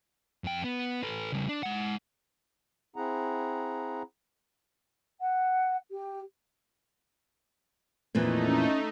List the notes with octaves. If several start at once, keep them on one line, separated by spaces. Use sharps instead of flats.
F2 G5
B3
A4 B4
C#3 G3
D4
G#3 F#5
C4 E4 G#4 F#5 A#5
F#5
G4
F2 A#2 E3 A3 D#4
C#4